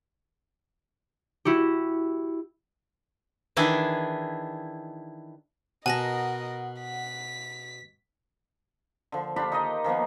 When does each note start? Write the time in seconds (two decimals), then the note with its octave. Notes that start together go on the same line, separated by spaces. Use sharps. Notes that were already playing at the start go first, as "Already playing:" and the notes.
1.45 E4 F#4 G4
3.57 D#3 E3 D4 E4 G#4
5.86 B2 A#4 D#5 F#5 G#5 A5 A#6
6.81 B6
9.12 D3 F3
9.36 D4 F4 G4 B5
9.52 D#4 G4 A#4 D#5
9.84 D#3 F3 A#3 B3